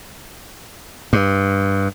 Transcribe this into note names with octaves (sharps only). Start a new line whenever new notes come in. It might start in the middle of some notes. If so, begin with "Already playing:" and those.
G2